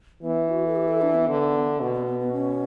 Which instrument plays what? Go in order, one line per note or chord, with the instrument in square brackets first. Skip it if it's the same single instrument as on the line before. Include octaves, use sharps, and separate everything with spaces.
[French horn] E3 [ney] B3
[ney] F#4
A4
G4
A4
D4
B3
[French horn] D3
[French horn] B2 [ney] B3
[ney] B3
B3
B3
C#4